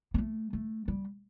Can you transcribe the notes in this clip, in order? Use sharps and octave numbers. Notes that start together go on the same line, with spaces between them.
B3
A3
A3
G3